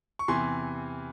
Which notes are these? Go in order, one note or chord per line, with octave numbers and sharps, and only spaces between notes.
C#6
E2 C3 E3 G#5 C6